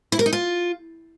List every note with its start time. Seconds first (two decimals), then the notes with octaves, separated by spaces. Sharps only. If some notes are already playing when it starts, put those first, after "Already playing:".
0.12 E4
0.19 A#4
0.26 D#4
0.33 F4